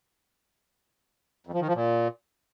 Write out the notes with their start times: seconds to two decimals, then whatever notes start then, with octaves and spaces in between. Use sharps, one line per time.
1.47 F2
1.54 F3
1.61 D#3
1.68 F3
1.75 A#2